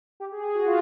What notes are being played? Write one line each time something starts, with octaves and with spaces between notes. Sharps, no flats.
G4
G#4
G#4
F#4
F4